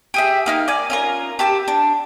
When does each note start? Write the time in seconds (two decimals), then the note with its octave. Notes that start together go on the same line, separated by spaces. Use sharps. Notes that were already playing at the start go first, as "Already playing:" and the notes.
0.14 G4 G#4 E5
0.46 A#3 D#4 F6
0.68 D5 G#5
0.90 C#4 F4 A#4
1.39 G4 A5 E6
1.68 D4